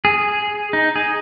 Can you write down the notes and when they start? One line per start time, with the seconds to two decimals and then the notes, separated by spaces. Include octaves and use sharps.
0.05 G#4
0.73 D#4
0.96 G#4